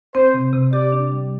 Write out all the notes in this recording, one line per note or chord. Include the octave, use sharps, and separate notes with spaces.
C4 C5
C3
C3
G4 D5
D4
G3